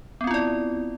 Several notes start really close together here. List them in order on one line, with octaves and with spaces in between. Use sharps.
B3 C4 F4 E4 D5